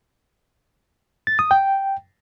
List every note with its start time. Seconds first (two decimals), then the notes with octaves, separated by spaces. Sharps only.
1.27 A6
1.39 D#6
1.51 G5